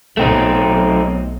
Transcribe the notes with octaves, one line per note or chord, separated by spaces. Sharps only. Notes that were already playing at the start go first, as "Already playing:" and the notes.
B1 A3 C4 D#4